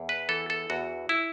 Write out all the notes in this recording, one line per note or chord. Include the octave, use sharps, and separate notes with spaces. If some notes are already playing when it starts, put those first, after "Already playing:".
Already playing: E2
B4
E3 A4
A4
E2 F#4
E4